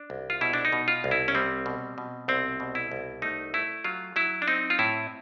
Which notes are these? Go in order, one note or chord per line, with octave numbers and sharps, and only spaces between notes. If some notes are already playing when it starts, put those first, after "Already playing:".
Already playing: D4
C2
F4
B2 E4
D4
D#4
B2
F4
C2
E4
C#4
G3 C4
B2
B2
C2 C4
B2
E4
C2
A3 D#4
A3 E4
F#3 F4
F#3 E4
D4
C4 D#4
F4
A2 E4